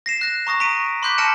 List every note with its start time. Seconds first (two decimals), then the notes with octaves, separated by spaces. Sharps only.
0.06 A#6 C7 E7
0.21 F#6 A#6
0.47 A#5 C#6 D#6 A#6
0.60 A#5 B6 D7 D#7
1.02 B5 C6 D6 F#6 G6 B6
1.18 A5 F6 A#6 C#7 D7 E7